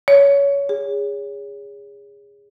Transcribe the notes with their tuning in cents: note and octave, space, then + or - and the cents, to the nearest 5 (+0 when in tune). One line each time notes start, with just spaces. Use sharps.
C#5 +20
G#4 -25